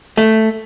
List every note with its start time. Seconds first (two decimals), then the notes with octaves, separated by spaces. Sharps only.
0.17 A3